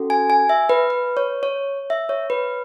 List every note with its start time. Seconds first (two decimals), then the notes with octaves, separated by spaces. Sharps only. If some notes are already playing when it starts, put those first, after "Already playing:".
Already playing: C#4 F#4 A4
0.10 G#5
0.30 G#5
0.49 E5
0.69 B4
0.90 B4
1.17 C#5
1.43 C#5
1.90 E5
2.09 C#5
2.30 B4